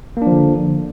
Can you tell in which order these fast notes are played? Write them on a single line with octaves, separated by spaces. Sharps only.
A#3 D4 F3 D3